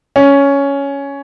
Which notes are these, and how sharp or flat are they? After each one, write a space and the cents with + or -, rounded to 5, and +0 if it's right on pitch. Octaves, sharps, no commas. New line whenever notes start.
C#4 +10